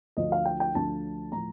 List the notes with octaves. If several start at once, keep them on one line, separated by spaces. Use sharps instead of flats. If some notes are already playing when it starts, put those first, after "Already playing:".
D2 D3 F3 D#5
F5
G5
G5
D2 D3 F3 A5
A2 F3 A#5